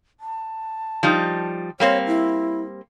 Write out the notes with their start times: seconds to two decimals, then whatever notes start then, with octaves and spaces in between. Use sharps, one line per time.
0.20 A5
1.03 F3 G3 D#4
1.80 G3 A#3 C4 C#5
2.07 E4